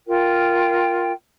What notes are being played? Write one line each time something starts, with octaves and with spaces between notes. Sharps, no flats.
F4 A#4 G5